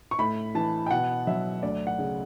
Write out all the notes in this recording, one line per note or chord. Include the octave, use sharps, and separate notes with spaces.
C#6
A2 B5
E3 A5
G5
B2 F#5
F#3 E5
D2 D5
F#5
C#3